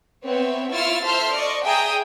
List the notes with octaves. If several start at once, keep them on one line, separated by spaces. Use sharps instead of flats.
B3 C4 C#5 E5
E4 F4 C#6 E6 F6 A6
A4 C5 E5 C6 F6
D5 D#5 C#6
G#4 E5 G5 A#5 D#6